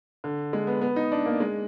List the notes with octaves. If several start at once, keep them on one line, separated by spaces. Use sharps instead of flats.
D3
G#3
B3
B3
D#4
D4
A#3
G#3